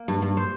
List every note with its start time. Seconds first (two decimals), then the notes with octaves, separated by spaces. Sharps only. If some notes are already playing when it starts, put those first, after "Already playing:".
Already playing: A#3
0.08 G2
0.22 G2
0.37 C5